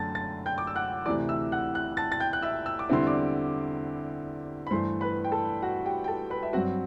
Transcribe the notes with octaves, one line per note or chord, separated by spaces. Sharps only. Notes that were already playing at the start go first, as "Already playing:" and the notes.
Already playing: F#2 D3 A3 A5 A6
A5 A6
G5 G6
D6
E6
F#5 F#6
D2 C3 E3 D5 D6
E5 E6
F#5 F#6
F#5 F#6
A5 A6
A6
G5 G6
F#6
E5 E6
E6
D6
E2 D3 G3 C4 E4 C6
D5 D6
B5
G2 E3 A3 C5 C6
B4 B5
G5
A4 A5
F#4 F#5
G4 G5
G5
A4 A5
B4 B5
E5
G2 F#3 C4 F#4 F#5